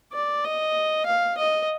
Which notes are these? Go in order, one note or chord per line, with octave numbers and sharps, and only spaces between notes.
D5
D#5
F5
D#5